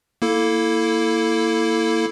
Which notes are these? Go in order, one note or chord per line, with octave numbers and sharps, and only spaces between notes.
A#3 E4 A4